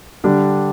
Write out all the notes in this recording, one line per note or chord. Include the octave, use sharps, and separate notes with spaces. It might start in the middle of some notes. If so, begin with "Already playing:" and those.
D3 G3 D4 G4